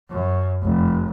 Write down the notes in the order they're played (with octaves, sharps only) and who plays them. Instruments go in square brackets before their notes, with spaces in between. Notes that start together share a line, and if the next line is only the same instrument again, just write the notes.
[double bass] F#2
F1